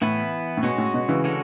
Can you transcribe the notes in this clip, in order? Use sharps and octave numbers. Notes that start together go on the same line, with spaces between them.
A2 E3 B3 E4 B4
A2
B2 G#3 C#4 F#4
A2
B2
C#3 E3
D3 G#3 C#4 F#4 A4